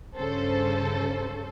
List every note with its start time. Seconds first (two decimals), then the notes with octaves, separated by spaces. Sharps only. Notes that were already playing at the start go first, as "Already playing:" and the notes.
0.17 G2 C#3 C#4 A4 C5